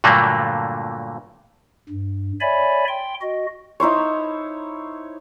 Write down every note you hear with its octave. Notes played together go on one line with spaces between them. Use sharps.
G2 A#2 D3 F#3 A3 A#3
G2
C#5 D5 E5 G#5 B5
G5 C6
F#4 D#5
D#4 E4 C5 C#5